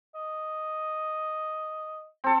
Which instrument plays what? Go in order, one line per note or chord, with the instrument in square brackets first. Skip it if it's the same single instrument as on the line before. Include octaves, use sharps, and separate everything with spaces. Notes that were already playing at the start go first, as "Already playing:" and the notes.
[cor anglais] D#5
[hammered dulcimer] C4 A4